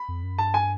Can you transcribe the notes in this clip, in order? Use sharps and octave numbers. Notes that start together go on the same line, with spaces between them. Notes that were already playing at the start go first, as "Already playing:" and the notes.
Already playing: B5
F2
F#2
G2 A5
G#5